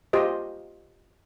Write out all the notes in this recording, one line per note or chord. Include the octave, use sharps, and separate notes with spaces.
F4 G4 C5 D#5